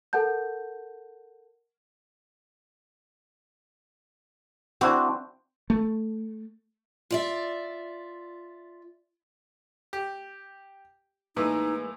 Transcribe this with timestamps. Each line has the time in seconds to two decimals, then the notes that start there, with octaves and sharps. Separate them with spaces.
0.13 A4 A#4 F#5 A5 G6
4.81 C4 D4 E4 F#4
5.70 A3
7.11 F4 D5 E5
9.93 G4
11.37 A2 E3 G#3 A#3 D#4 B4